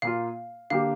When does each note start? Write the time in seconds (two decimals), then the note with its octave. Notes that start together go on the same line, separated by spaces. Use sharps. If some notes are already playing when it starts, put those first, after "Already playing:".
0.02 A#2 A#3 F4 F5
0.70 D3 A#3 G4 F5